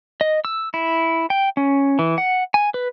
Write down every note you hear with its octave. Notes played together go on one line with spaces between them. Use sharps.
D#5
E6
E4
G5
C#4
E3
F#5
G#5
B4